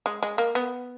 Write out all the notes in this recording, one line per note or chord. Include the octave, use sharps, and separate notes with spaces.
G#3
G#3
A#3
B3